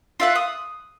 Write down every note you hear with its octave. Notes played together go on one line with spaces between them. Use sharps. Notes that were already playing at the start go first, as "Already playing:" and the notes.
F4 E5 F#5
D#6